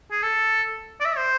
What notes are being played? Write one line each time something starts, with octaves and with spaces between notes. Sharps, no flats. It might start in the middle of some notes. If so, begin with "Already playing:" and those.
G#4
A4
D5
E5
C5